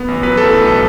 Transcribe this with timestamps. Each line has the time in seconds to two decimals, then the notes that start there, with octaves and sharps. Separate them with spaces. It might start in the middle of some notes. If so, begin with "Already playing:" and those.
Already playing: B3
0.08 A1
0.23 F#3 B4
0.37 A2 A4
0.52 B1
0.68 A4